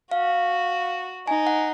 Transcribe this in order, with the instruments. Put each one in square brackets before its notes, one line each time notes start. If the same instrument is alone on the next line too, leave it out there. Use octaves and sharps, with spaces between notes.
[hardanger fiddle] F#4 [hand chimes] F5
[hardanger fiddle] D#4 [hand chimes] G#5
[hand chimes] F#5